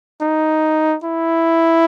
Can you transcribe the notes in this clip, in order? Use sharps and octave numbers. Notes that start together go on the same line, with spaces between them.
D#4
E4